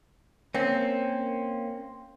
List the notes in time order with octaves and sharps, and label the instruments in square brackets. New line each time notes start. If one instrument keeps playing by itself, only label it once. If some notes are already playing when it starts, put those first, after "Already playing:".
[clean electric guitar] A#3 C#4 [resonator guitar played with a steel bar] C4